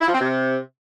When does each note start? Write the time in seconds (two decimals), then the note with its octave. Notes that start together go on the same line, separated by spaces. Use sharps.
0.01 E4
0.07 F3
0.13 C4
0.20 C3